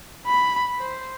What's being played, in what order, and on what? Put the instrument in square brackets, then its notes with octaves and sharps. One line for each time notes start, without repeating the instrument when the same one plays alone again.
[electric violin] B5
C5